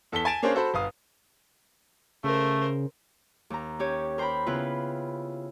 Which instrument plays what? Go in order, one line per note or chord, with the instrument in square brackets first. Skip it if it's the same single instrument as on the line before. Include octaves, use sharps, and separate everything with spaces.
[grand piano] E2 A4 A5 B6 G7
G#5 A5 A6 D7 E7
A#3 C#4 D4 G#4 C5
F#4 A4 C5 B5
G1 F5 D#6
[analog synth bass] C#3 [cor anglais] A3 [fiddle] A#4 C5
[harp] D#2 A#5
C#4 G4 C#5
A#4 C5 G5 A#5 B5
C#3 B3 E4 F4 B4